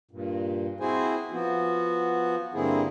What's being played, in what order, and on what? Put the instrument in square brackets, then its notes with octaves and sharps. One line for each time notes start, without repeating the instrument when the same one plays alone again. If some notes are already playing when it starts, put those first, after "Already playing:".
[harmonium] G2 A#2
C4 E4 F#4 G#4 C5 G#5
F3 B3 F#4
G2 D3 A#3 C4 E4 G#4